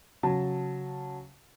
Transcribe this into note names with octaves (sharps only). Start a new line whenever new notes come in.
C#3 F#3 A5